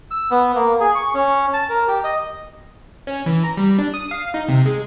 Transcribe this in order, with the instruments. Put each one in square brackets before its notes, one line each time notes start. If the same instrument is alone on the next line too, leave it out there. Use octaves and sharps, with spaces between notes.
[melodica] E6
B3
A#3
G#4
C#6
C#4
A5
A#4
G4
D#5
[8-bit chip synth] C#4
E3
A#5
G3
D4
D#6
F5
D#4
C3
G#3